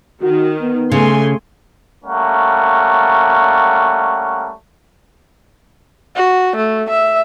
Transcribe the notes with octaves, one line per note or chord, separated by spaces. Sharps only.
D#3 F#4
B3
C#3 A3 G#5 C6
G3 A3 A#3 C#4 F#5
F#4
A3
E5